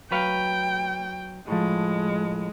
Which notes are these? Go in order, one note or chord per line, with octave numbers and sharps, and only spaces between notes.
F#3 B4 F5 G5
A2 F3 G#3